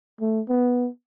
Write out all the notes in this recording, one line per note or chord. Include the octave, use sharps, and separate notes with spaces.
A3
B3